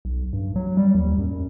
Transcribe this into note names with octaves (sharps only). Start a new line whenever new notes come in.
B1
G2
F#3
G3
D#2
F#2
F#2